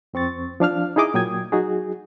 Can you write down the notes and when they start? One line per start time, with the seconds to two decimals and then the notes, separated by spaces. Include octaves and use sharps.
0.14 F2 C4 C#6 A6
0.60 F3 D4 F5 F6
0.96 D#4 E4 G#4 D#5 D6 D#6
1.14 A#2 F#3 G5 D#6 G#6
1.52 F#3 D#4 F#4 G#4